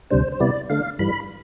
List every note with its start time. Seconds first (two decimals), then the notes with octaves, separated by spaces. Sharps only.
0.11 D2 C3 G3 D4 C5
0.32 C5
0.40 C3 G3 B3 E4 D5
0.70 D3 A3 D4 F5
0.99 G2 E3 G3 B5